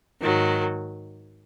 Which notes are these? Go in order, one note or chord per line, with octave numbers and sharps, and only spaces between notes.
G#2 D#3 F#3